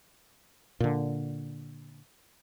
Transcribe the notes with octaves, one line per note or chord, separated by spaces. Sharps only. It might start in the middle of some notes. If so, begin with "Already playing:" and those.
A#2 D3